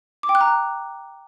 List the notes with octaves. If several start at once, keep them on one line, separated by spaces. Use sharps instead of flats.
D6
G5
F#6
A#5